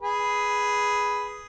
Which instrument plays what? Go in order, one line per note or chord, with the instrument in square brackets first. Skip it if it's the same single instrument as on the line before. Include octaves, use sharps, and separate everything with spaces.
[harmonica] G#4 B4